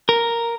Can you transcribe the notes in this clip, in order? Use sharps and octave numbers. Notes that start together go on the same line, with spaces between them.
A#4